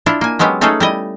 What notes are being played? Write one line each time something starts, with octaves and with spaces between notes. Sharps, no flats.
D4 E4 F4
A#3 G#5
F#3 G#3 B3 C#4 G4
A3 C#4 D#4 F4 G#4 A4
G3 E4 D#5